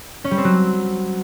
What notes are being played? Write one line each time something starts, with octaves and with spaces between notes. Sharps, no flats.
C#4
G3
C4
F#3